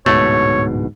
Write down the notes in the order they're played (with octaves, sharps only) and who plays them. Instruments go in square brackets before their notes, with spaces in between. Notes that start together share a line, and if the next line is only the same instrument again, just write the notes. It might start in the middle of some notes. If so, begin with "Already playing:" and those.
[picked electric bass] D1 G#2 B2 [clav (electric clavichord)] A3 [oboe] C#5